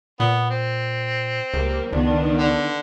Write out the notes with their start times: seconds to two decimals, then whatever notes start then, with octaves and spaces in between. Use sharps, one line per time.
0.20 A#2 B3
0.50 C4
1.54 C#2 G3 A#3
1.93 C#2 D#3 B3 D4
2.37 D3